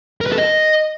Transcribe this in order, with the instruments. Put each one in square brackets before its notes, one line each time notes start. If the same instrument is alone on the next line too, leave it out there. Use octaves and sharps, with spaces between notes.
[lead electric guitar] A#4
B4
A4
D#5